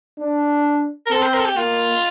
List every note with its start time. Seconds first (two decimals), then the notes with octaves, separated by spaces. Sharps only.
0.19 D4
1.06 A#4
1.11 C4 A4
1.23 C5
1.34 A#4
1.40 A4
1.46 G4
1.57 A#3 F4